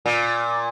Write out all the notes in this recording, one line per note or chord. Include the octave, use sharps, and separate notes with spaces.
A#2